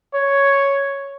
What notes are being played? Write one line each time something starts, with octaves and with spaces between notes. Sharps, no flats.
C#5